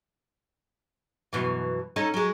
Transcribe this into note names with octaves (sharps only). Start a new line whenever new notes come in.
F#2 B2 E3
C#4 D#4 A4
F#3 G#3